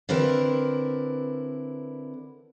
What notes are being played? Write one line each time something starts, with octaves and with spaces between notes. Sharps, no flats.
D3 C4 E4 A#4 B4